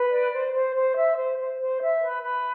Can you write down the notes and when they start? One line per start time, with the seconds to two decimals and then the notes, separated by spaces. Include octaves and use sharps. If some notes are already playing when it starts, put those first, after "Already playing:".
Already playing: B4
0.11 D5
0.32 C5
0.54 C5
0.75 C5
0.96 E5
1.18 C5
1.39 C5
1.60 C5
1.82 E5
2.03 B4
2.24 B4